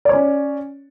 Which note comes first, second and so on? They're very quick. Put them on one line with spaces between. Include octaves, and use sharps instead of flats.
D5 C#5 C#4